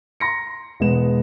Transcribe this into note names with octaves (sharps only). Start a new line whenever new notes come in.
A#5 C6 A#6 C#7
E1 G#3 B3 E7